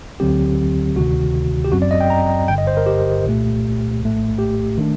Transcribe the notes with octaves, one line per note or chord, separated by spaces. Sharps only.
D2 D3 F#3 C4 G4
D2 C3 D#3 F#4
G4
G1 F#2 F#3 C4 F#4
D5
D#5
G5
A#5
G1 G2 D3 G5
D#5
C5
A#4
G4
C2 A#2 A3
A#1 A2 A3
G4
D#3 A3 D4